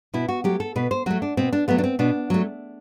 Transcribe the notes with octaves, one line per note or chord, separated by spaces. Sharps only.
B2 E4
F#4
F#3 A3 G4
A4
B2 B4
C5
F#3 A3 F#4
D4
B2 C4
D4
F#3 A3 B3
D4
C4
B2 D4
F#3 A3